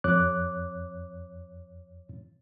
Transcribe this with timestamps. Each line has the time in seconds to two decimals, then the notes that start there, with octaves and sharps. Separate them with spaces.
0.04 F2 C#5 D6 F#6